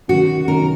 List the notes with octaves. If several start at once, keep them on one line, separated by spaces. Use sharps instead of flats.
D#3 F#3 C#4 F#4
D#3 F#3 C#4 A#4